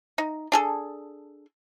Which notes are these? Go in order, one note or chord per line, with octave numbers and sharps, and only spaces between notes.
D#4
D4 G#4 A4